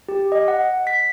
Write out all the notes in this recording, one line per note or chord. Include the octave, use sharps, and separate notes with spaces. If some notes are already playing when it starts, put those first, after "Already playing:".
G4
D#5
F#5
B6